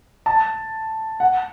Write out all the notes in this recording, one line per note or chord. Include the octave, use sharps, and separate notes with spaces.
A5
F#5